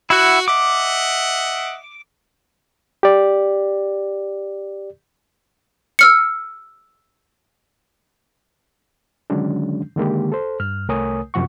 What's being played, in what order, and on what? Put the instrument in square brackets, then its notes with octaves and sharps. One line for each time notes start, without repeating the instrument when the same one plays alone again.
[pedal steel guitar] E4 F#5 [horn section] F#4
[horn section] D#5 E5 F#5 [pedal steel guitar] D6
[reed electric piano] G4 D5
[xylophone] E6 F6 C#7
[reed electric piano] D3 D#3 F#3 G#3 C#4 D4
D3 D#3 G#3 A#3 G4
A4 C5
G2 F6
C2 A3 A#4 C#5 G#5 D#6
F#2 C3 F3 F#5 C#6